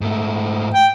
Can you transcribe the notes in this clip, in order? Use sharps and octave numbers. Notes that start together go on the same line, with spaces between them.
G#2 A3
G5